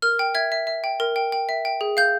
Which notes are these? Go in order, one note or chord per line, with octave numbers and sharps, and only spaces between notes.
A#4 F6
G5
E5 G#6
E5
E5
G5
A#4
G5
G5
E5
G5
G#4
F5 G6